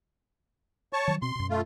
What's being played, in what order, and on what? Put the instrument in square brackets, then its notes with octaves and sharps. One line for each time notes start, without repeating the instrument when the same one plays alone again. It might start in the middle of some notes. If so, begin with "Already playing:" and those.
[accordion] C#5 A5 C#6
[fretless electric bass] D#3 F3 F#3
[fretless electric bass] B2 C4 [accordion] C6
[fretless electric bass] F#2 B2
[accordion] A3 F4